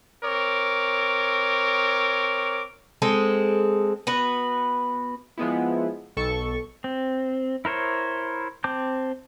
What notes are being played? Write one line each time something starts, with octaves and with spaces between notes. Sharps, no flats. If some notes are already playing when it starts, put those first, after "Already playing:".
C4 A#4 C#5 D6
G#3 C4 A4
B3 F#4 B4
F3 G#3 B3 E4
B1 A4 C#6
C4
E4 A#4 C5 C#5
C4 A5 D6 G6